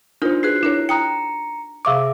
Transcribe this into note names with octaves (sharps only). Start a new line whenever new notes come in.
D4 D#4 F4 A#4 C5
F#4 G#4 B4 F#6 C7
D4 E4 A#4 C#5
G5 A#5 D#6 F#6 C#7
C3 G#4 E5 F5 C#6 D6